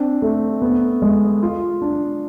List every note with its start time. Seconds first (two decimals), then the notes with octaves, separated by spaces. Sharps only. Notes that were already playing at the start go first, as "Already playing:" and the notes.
Already playing: C4 D4
0.22 A3
0.62 B3
1.02 G#3
1.43 F4
1.82 D4